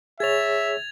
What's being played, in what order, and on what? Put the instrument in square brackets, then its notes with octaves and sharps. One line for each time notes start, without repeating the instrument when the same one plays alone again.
[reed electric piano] G#4 C#5 [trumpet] E5 [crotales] G#6 A6 F7